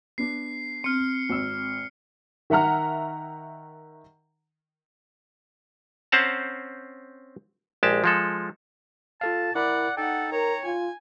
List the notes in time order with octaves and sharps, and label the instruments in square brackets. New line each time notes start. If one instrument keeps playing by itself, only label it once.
[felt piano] B3 D4 [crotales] C7
[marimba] C4 [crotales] F6 C#7
[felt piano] G#1 E6
[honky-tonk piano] D#3 E5 F#5 A#5 F6
[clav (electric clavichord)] C4 C#4 C5 F#5 A5 A#5
A#1 G#3 G4 A5
F3 G#3 A4
[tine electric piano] F4 A4 F5 [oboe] A5
[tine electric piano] E4 A#4 B5 [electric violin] D5 [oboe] F#5
[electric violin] D#4 F#5 [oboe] A4 [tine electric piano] G5
[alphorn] A#4 [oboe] C#5 [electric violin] A#5
[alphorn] F4 [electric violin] G#5